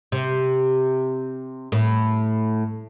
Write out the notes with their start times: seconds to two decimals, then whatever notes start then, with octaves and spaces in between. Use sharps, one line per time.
0.12 C3
1.72 A2